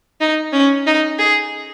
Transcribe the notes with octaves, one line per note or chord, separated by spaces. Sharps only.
D#4
C#4
D#4
G#4